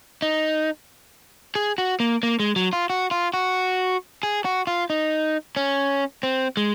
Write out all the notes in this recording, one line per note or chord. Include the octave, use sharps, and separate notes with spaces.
D#4
G#4
F#4
A#3
A#3
G#3
F#3
F4
F#4
F4
F#4
G#4
F#4
F4
D#4
C#4
C4
G#3